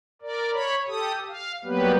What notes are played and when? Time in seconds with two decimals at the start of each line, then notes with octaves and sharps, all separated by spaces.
0.22 A#4 D5
0.53 C#5 B5
0.88 G4 A4 D#6
1.28 F5
1.64 F#3 G3 A#3 B3 G4 B4